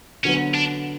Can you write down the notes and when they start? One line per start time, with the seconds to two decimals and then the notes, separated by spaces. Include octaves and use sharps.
0.24 D3 F#3 B3 C#4
0.54 D4